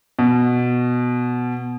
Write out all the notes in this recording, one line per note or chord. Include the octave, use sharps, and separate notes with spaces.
B2